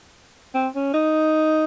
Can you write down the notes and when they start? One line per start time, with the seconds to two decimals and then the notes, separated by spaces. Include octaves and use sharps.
0.54 C4
0.75 C#4
0.94 D#4